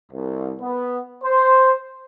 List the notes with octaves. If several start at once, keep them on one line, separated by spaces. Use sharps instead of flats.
C2
B3
C5